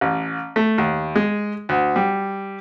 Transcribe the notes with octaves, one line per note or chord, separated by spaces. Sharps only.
A1
A3
D#2
G#3
D2
G3